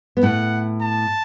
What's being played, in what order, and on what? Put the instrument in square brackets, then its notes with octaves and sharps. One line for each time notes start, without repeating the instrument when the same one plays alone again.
[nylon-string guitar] B3
[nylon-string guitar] A2 A3 [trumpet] F#5
[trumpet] A5